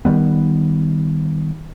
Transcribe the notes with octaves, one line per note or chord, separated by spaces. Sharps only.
D#3 F3 G3 B3